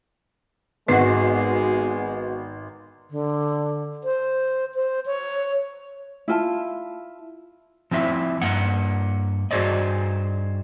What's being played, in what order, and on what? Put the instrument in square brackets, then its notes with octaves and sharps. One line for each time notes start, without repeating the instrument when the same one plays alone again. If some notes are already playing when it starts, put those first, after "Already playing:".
[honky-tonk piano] G#1 [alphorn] G#3 [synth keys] B3 F#4 [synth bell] B4 C7
[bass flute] D3
C5
C5
C#5
[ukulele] E4 F4 A5
[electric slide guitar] F3 C4 E4 E5
G2 A#3 F#5
G2 F#4 G#4 C5 D5 D#5